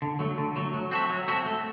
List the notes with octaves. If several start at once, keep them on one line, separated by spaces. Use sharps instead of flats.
D3
F#3 A3
D3
F#3 A3
F#3
C4 F#4 A4 E5
F#3
C4 F#4 A4 E5
A3